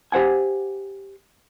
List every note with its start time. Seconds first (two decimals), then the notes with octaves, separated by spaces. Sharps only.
0.12 G4 C5 F#5 G#5